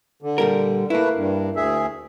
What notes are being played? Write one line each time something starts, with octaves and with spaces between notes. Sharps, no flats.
D3
A#2 G3 A#4
A3 A#3 E4 B4
G2
D2 G#4 E5